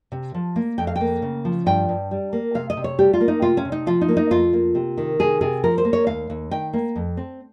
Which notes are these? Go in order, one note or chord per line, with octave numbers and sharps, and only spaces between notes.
C3
F3
A#3
F2 G5
F5
A#3 G5
C#3
F3
G2 G5
G2
G3
A#3
C3 F5
D#5
C3
C#5
G3 G4
F4
A#3
D#4
C3 F4
C#4
C3
D#4
F3 F4
D#4
A#3
D#4
F2 F4
A#3
C3
D#3
C3 G#4
C3 G#4
F3 A#4
C5
A#3
C#5
D#2 F5
D#2
D#3 G5
A#3
F2
C4